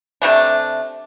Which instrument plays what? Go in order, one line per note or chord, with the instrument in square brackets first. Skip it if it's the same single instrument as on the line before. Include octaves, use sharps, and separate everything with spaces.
[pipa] C3 A3 D4